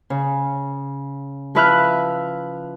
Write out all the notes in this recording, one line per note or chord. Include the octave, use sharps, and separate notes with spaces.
C#3
F3 E4 B4 E5 F6 F#6